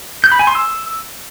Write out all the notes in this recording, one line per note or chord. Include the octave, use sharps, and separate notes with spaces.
G6
B5
G#5
C6
E6